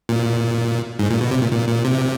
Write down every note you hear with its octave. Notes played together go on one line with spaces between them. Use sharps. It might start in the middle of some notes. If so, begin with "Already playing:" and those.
A#2
G#2
A#2
B2
C3
A#2
A#2
A#2
C3